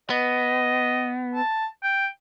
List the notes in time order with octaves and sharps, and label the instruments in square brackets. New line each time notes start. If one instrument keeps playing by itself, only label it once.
[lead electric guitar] B3 [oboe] D#5
[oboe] A5
G5